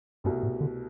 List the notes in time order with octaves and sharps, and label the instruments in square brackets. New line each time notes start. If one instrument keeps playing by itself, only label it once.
[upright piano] C2 B2 A3 [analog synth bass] G2
[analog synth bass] A2
D3